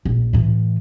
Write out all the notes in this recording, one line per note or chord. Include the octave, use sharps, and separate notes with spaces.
A#1
A2 E3